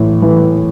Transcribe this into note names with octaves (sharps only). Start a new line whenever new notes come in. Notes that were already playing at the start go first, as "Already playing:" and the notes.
Already playing: A2 E3
E3